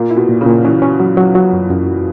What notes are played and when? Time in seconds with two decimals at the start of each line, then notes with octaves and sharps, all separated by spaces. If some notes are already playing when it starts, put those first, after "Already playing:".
Already playing: A#2 A#3
0.11 E4
0.17 B2
0.29 A#2
0.41 C#3
0.46 A#2
0.65 E3 C#4
0.82 C#4
1.00 F#3
1.17 F#3
1.35 F#3
1.53 F#2
1.70 F#2